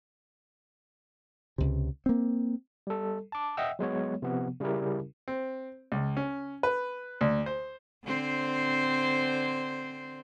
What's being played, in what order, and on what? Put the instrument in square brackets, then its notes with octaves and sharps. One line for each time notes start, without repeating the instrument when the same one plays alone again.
[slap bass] C#2 C3
A#3 C4
[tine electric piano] G3 A4
A5 D6
D#5 E5 F#5 G5 E6
F#3 G#3 B3 C#5
C3 F3 B3
C#3 G3 C#4 E4 G4 A#4
[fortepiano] C4
C#2
C#4
B4
D2
C5
[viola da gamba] D3 C4 C5